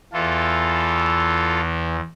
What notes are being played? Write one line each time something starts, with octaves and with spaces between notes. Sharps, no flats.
E2 E3 F4 A4